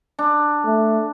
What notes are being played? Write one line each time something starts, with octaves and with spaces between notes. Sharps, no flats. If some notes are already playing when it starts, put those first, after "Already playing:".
D4
A3